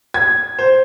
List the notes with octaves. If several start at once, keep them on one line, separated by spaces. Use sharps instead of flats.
G#6
C5